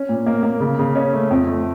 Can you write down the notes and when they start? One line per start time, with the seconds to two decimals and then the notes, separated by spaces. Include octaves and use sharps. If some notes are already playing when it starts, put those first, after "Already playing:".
Already playing: C#4
0.09 A#2
0.26 A#3
0.43 A#3
0.60 C#3
0.79 C#3
0.95 C#4
1.13 A3
1.31 F2
1.47 A3